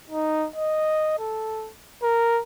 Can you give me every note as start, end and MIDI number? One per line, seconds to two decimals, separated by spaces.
0.10 0.47 63
0.56 1.18 75
1.19 1.70 69
2.03 2.41 70